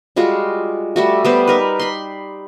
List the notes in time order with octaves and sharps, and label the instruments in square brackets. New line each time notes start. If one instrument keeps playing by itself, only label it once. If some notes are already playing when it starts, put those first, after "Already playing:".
[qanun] G3 G#3 F4 F#4
G3 A3 F#4
G3 B3 C5
D#4 A#4 B4
B5 C6